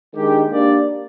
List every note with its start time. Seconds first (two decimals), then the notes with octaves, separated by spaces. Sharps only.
0.15 D#3 G#3 D4 G4
0.50 A#3 D4 G4 D5